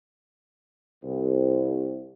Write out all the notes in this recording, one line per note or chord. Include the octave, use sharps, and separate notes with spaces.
C2